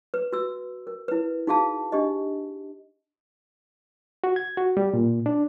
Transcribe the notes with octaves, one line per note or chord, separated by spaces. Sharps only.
B4
F#4 E6
A#4
E4 B4
D#4 F#4 G#4 F5 A5
D4 G4 D#5
F#4
G#6
F#4
G3
A#2
D4